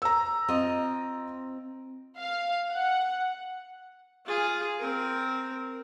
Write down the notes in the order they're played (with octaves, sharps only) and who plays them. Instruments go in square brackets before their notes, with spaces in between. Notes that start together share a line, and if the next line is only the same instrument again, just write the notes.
[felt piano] A#5 E6
[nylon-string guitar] C4 F4 D#5
[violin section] F5
F#5
[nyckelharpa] F4 G#4
C4 A#4